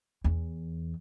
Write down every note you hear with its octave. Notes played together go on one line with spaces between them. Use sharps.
E2